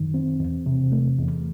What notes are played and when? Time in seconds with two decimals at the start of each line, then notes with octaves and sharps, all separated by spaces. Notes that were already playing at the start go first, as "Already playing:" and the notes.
Already playing: F#2 D#3
0.14 C4
0.40 E2
0.66 C3
0.92 A3
1.18 E2